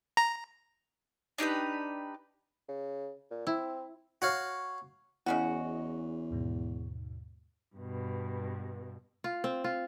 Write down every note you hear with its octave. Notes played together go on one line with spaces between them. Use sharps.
A#5
D4 D#4 G4 B4
C#3
A#2
C4 E4
F#4 C#5 F5
E2 C#3 C#4 E4 F#4 D#5
D#2 G#2 B2
G2 B2
F4
C4
F4